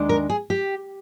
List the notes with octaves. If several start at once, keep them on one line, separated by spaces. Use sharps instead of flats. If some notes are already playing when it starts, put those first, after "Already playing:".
Already playing: D#2 D#3 G#3 D4
A#4
G#4
G4